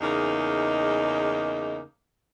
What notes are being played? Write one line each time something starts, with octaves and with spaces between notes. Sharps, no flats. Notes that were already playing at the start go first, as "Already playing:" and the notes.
E2 C#3 A#3 D#4